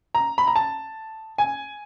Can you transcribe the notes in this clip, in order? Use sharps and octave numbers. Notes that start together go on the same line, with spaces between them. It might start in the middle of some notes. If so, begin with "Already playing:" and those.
A#5
B5
A#5
A5
G#5